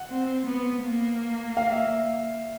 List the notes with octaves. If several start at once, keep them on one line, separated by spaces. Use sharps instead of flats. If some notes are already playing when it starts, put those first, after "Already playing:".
Already playing: F#5
C4
B3
A#3
F5
E5